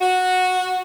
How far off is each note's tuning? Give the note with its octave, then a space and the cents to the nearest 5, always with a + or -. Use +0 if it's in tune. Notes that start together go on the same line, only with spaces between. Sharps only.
F#4 -10